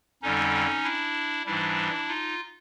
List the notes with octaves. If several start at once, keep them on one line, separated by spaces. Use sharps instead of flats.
F2 D3 G3 C#4 D#4
D4 E4
G#2 E3 G3 D4 E4
D#4 F4